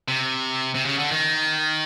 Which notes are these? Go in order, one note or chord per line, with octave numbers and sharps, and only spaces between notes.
C3
C3
C#3
D3
D#3